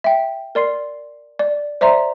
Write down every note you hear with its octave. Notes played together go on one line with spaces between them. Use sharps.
E5 G5
A#4 D5 C6 C7
D5
C5 D5 E5 A#5 C6